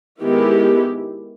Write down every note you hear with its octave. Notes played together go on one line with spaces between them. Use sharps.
D#3 G#3 B3 E4 G4